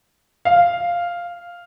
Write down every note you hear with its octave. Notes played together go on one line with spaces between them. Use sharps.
F5